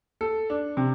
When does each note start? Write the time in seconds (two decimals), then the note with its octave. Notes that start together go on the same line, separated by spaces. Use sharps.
0.21 A4
0.50 D4
0.77 C3